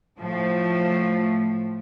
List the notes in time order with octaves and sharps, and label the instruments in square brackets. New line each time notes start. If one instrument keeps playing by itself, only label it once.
[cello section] A2 F3 A3